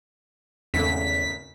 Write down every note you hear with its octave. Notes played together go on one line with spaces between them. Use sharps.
G#1 E2 C#3 A3 B6